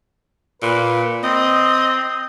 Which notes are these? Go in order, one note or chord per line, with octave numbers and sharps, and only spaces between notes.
A#2 B4
C4 D#5